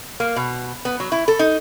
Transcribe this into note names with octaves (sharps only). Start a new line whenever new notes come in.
A#3
B2
B3
F#3
E4
A4
D#4